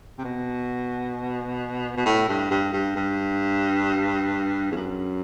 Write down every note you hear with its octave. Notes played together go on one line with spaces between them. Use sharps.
C3
B2
B2
A2
G2
G2
G2
G2
E2
F#2